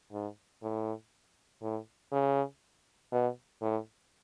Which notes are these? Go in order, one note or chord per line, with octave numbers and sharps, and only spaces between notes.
G#2
A2
A2
C#3
B2
A2